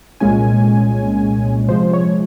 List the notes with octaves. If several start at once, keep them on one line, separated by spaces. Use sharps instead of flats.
C2 A#2 G#3 C#4 G#5
C3 F3 G#3 C5
C#5